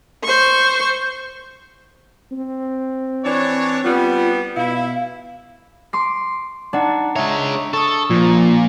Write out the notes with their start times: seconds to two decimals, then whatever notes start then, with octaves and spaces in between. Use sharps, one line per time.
0.24 C5 C#6
2.32 C4
3.24 E3 D4 C#5
3.84 G3 B3 F4
4.56 B2 E4 F5
5.93 C6 D6 C7
6.73 D4 D#4 D5 F#5
7.16 G#3 C#5 E5 A#5
7.73 A4 C#6 D#6
8.10 A#2 F3